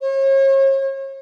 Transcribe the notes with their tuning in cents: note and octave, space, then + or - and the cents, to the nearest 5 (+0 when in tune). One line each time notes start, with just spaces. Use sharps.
C#5 -40